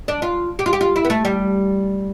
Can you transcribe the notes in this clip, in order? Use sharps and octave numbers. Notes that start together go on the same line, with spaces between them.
D4
F4
G4
F4
G4
F4
E4
B3
A3
G3